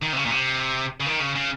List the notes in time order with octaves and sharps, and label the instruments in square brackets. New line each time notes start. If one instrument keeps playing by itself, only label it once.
[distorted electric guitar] D#3
C3
C#3
A#2
C3
C#3
D#3
C#3
C#3